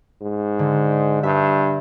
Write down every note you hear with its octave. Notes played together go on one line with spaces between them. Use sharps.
G#2
D3
G2 E5